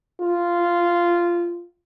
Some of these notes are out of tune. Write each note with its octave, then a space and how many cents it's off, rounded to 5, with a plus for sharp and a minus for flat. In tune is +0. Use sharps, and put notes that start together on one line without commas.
F4 -10